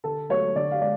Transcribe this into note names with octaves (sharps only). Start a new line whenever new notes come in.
D3 A4
F#3 A3 C#5
D3 D5
F5
G#3 D5